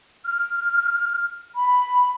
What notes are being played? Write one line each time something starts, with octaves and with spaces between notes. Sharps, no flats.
F6
B5